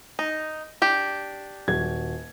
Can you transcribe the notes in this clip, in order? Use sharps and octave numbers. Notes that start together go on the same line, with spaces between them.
D#4
D4 G4
D#1 F#4 G#6